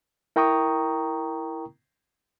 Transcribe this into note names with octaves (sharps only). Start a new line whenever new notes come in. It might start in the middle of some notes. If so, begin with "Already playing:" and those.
E4 A#4 G5 A#5 C#6 D#6